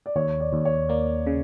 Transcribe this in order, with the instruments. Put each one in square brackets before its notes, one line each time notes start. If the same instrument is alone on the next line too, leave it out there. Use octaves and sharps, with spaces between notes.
[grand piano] D5
[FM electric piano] D#2 [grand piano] C#5
[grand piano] D5
[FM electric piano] D#2
[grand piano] C#5
[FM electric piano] A#3 [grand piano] D5
[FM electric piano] C#3